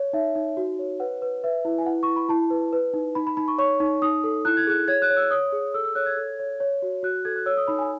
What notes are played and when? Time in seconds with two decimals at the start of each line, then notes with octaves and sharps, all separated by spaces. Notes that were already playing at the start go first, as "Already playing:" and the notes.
Already playing: C#5
0.13 D#4 E5
0.36 D#4
0.57 F#4
0.79 C#5
1.00 B4 F#5
1.22 B4
1.44 B4 E5
1.65 E4
1.79 G#5
1.86 E4 F#5
2.03 E4 C#6
2.16 B5
2.29 E4 A5
2.50 B4
2.73 B4
2.94 D#4
3.15 D#4 B5
3.27 B5
3.37 D#4 B5
3.48 C#6
3.58 C#5 C#6
3.80 D#4
4.02 D#4 D#6
4.24 A4
4.45 E4 F#6
4.57 G#6
4.67 G#4 F#6
4.88 C#5 G#6
5.02 F#6
5.10 C#5
5.17 E6
5.31 C#5 D#6
5.52 G#4
5.74 A4 E6
5.84 E6
5.95 C#5 F#6
6.06 G#6
6.17 A4
6.39 C#5
6.60 C#5
6.82 F#4
7.03 F#4 F#6
7.25 A4 G#6
7.36 F#6
7.46 C#5 E6
7.57 D#6
7.68 D#4 B5
7.79 G#5